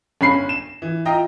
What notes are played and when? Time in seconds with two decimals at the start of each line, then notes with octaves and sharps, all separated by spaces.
0.21 G1 C#4 B5 C7
0.49 E7
0.82 E3
1.05 F4 D#5 E5 G5 A#5